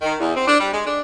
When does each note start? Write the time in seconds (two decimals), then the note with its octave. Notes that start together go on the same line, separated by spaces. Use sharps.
0.02 D#3
0.20 E2
0.35 C4
0.47 D4
0.59 G3
0.73 G#3
0.86 D4